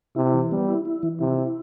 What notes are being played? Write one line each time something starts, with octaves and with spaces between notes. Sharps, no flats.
C3 E4
E3
G3 B3
E4
E4
E3
C3 E4
E4